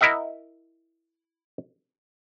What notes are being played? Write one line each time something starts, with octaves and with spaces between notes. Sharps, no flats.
E4 A#4 D#5 E5 F#5